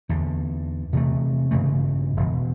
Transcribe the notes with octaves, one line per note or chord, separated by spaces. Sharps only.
E2 D3
C3 E3 A3
G2 C#3 E3 A3
E1